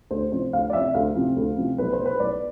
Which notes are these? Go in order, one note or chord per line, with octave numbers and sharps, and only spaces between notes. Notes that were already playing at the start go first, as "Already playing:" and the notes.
D2 C5
C3 F3 C5
D2 F5
D5
C3 F3 E5
D2 F5
C3 F3
D2
C3 F3
B1 B4
C5
B2
B4
B1 D5